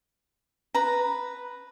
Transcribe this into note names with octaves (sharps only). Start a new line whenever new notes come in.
B4 A#5